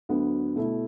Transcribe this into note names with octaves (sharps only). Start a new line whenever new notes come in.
D2 D3 F#3 B3
B2 A3 E4